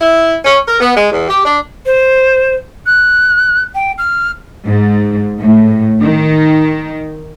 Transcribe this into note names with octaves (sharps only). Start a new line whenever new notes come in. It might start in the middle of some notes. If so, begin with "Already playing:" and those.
E4
C#4
A#4
B3
G#3
E2
G4
D4
C5
F#6
G5
F6
G#2
A2
D#3